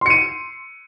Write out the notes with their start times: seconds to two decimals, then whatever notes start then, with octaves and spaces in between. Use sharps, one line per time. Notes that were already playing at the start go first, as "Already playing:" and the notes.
0.01 C6
0.06 C#7
0.10 D#7